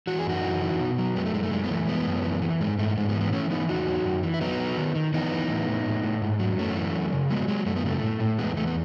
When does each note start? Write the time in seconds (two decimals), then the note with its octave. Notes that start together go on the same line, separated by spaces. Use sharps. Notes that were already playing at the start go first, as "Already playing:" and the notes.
0.07 E3 F#4
0.19 G#4
0.26 F#2 D#4 F#4
0.43 E3
0.61 E3
0.79 B2
0.98 F#3
1.16 F#2 G#3 B3
1.25 A3
1.34 F#2 G#3
1.43 A3
1.51 F#2 G#3
1.64 B3
1.70 E3 A3
1.88 F#2 G#3 B3
2.06 F#2
2.24 E3
2.42 E3
2.60 G#2 G#3
2.78 G#2 A3
2.97 G#2 G#3
3.03 C#4
3.09 G#3 B3
3.15 E3
3.21 G#3 B3
3.33 E3 A3 C#4
3.51 E3 B3 D#4
3.69 E2 D#4 F#4
3.88 F#3
4.04 F#2
4.23 E3
4.34 E4
4.41 F#3 B3 D#4
4.60 F#3
4.77 D#3
4.95 D#3
5.14 E3 B3 D#4
5.32 E3
5.49 A2
5.68 A2
5.85 A2
6.04 A2
6.22 G#2
6.39 F#3
6.58 F#2 A3 C#4
6.76 E3
6.94 F#3
7.12 C#3
7.30 F#3 G#3 B3
7.48 F#3 G#3
7.66 F#2 A3
7.76 B3
7.85 C#3 A3
8.02 A2
8.20 A2
8.39 E2 G#3 B3
8.57 E2 A3
8.67 B3